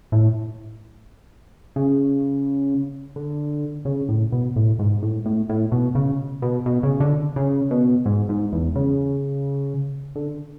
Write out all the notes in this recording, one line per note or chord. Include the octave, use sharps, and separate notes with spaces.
A2
C#3
D3
C#3
A2
B2
A2
G#2
A2
A2
A2
B2
C#3
B2
B2
C#3
D3
C#3
B2
G#2
G#2
E2
C#3
D3